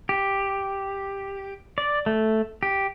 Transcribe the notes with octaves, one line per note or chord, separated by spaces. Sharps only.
G4
D5
A3
G4